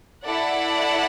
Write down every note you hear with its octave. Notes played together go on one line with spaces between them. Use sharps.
E4 A4 D5 F#5